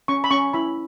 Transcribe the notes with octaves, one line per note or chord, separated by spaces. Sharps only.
C#4 C#6
B5
C#4 C#6
E4 B5